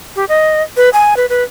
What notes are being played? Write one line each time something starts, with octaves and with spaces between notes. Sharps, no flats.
G4
D#5
B4
G#5
B4
B4